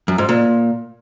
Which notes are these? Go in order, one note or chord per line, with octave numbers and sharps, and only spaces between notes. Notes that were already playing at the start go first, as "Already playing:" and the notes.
F#2
G#2
A#2